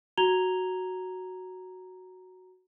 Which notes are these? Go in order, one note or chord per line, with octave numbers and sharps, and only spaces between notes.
F#4 A#5 G#6 F7 G7